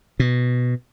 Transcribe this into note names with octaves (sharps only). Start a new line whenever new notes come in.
B2